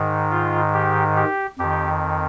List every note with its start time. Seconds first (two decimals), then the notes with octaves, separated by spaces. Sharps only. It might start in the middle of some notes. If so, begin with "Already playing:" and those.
Already playing: G#2 D#3
0.31 F4
0.74 G4
1.17 G4
1.58 F2 D#3 G4